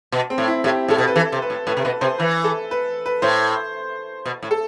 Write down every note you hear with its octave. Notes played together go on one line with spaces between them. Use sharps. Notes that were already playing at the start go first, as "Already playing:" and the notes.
B2
C4
A2
E4
A2 G4
A2 A4
B2
B4
E3 A4
C3
B4
A2
A2 B4
C3
B2 B4
C3 C5
E3 B4
A4
B4
B4
A2 C5
B2
A2
A4